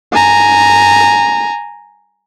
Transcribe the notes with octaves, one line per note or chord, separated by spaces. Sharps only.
G#5 A#5